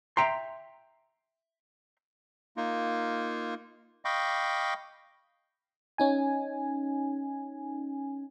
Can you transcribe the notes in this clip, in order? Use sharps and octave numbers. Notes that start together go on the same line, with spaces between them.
E5 G5 A#5 C6
A#3 D#4 F4
D#5 F5 G5 B5 C#6 D6
C#4 D#4 G#5